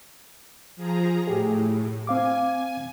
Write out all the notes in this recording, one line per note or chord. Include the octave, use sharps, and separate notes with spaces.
F3 G#4 A#5
A2 G4 G#4
C4 F5 G#5 D6